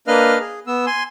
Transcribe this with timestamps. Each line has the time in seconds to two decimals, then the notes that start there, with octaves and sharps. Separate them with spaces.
0.07 A#3 D4 B4 D#5 F5 F6
0.40 G#4
0.67 B3 E6
0.87 G#5 C6